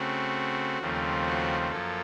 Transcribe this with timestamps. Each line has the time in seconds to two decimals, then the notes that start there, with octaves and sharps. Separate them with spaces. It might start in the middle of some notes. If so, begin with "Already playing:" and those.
Already playing: C#3 A3 C4 F#4
0.80 D#2 C#3 F3 A3 C4
1.26 F#4
1.71 F#2 F3 A#3 A4